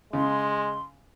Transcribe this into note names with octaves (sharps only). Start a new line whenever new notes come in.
C#3 G#3 C6